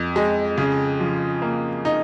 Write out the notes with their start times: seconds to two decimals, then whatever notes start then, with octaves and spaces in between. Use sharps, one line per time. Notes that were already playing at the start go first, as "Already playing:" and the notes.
Already playing: F2
0.16 G#3
0.58 C#3
1.00 F3
1.42 A#3
1.85 D#4